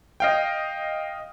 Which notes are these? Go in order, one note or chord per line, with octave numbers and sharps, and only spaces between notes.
D#5 F5 G5